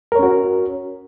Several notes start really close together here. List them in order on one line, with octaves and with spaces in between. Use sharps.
A#4 C#5 C#4 F#4